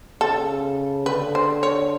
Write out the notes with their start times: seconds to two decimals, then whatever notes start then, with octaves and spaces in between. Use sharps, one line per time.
0.21 C#3 A4
1.06 D3 B4
1.35 C5
1.63 C#5